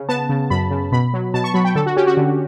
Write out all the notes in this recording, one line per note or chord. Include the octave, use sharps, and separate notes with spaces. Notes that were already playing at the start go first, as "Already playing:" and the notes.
Already playing: C#3
B3 A5
C#3
F#2 B5
C#3
B2 B5
F#3
B2 A5
C#6
F#3 B5
G5
D3 A4
F#4
C#4 G4
F#4
D3